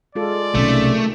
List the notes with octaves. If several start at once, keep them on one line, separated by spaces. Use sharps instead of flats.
G#3 F4 A4 D5
B1 C3 D#3 A3 C#4